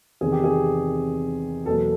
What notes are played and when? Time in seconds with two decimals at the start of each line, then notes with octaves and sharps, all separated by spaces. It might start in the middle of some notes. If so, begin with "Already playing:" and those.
0.21 E2 C3 D#3 G#4
0.32 G4
0.44 G#4
1.66 E2 B2 F#3 A#3 A4